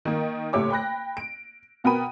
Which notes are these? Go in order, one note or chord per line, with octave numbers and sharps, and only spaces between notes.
D#3 A#3
F#1 A2 A3 G4 C#5 D6
G5 B5 F#6 A#6
D7
B2 B3 A#4 G5 B5 D#7